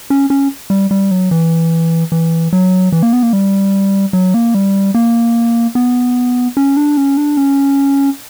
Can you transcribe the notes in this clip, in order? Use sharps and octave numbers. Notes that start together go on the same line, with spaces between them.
C#4
C#4
G3
G3
F#3
E3
E3
F#3
E3
A#3
B3
A#3
G3
F#3
A#3
G3
A#3
B3
C#4
D4
C#4
D4
C#4